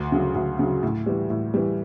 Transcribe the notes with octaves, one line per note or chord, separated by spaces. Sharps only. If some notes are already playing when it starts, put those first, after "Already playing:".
Already playing: D2
C#3 F#3
D2
C#3 F#3
A2
E3 G3
A2
E3 G3